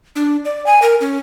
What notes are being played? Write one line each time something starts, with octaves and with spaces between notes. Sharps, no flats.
D4
D5
G#5
A#4
C#4